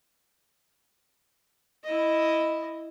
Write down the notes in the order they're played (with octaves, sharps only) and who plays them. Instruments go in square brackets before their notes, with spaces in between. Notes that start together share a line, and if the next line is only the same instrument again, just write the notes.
[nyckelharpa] E4 D#5